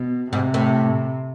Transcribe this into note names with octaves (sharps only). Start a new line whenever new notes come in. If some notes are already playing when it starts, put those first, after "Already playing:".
Already playing: B2
G#2 C3
A2